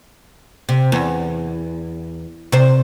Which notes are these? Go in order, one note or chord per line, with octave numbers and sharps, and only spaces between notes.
C3
E2
C3 C5